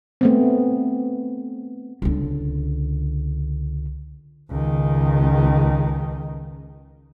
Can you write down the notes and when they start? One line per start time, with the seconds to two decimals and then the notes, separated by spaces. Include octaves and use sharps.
0.21 A3 B3 C4
2.02 C#2 D3
4.50 C#2 D#3